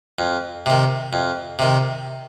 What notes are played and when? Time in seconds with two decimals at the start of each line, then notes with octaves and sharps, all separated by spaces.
0.19 F2
0.66 C3 D#3
1.13 F2
1.59 C3 D#3